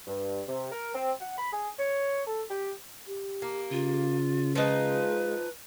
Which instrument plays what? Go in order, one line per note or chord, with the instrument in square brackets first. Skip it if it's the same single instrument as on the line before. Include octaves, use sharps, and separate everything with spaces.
[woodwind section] G2
C3
A#4
C4
F#5
B5
G#4
C#5
A4
G4
[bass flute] G4
[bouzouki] A#3
[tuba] C#3 [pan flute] F4
[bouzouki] F3 D#4 [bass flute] G#3 [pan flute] B4